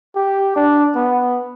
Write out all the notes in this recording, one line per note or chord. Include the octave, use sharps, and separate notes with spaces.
G4
D4
B3